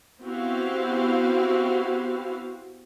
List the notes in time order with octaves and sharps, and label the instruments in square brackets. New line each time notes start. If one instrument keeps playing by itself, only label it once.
[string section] B3 C4 E4 F#4 G4 F5